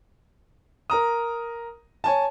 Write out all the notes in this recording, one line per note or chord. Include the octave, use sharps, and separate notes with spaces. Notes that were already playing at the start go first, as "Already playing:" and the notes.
A#4 A#5 D#6
C#5 G#5 A5